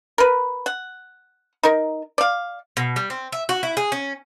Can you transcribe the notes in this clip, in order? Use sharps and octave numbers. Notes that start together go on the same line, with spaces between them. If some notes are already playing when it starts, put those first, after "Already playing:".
A#4 B4
F#5
D#4 A#4
D5 F5
B2
G3
C4
E5
F#4
E4
G#4
C#4